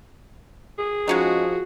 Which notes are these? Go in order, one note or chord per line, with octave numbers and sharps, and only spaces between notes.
G#4
F3 G#3 C#4 D#4 F#4